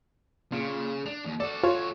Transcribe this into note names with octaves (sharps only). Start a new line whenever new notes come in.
A#2 C#3
D4 F7
D#2
F#4 A4 D5
F4 C#5